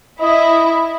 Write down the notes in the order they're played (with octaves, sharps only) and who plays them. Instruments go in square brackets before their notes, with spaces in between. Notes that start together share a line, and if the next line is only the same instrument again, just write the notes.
[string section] E4 [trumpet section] D#5